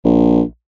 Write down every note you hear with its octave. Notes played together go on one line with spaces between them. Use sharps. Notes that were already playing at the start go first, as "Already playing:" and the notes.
A#1